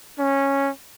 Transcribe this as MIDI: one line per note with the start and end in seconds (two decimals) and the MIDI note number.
0.17 0.69 61